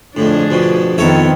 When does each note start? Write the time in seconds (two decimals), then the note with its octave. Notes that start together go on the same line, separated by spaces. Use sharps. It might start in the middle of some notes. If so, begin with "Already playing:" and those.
0.17 F2 A2 D3 D4 G#4
0.51 F2 B2
0.98 F2 D#3 B3 C4 A4 C#5 E5